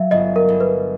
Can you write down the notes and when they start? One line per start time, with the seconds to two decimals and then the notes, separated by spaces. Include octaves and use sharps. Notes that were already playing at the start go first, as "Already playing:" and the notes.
Already playing: F#3 E5 F5
0.11 G1 D#5
0.36 A#4
0.48 G1
0.60 B4